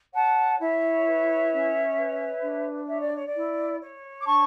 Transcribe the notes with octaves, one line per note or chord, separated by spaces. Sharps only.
C#5 F#5 A5
E4 C#5 E5
B4
C#4
B4
D4
C#5 E5
D5
C#5
D5
E4
C#5
D6
D4 A5 C#6